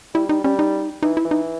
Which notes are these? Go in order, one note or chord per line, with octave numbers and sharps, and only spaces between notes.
G3 E4
G3 D#4
G3 C#4
D#4
E3 D#4
E4
E3
D#4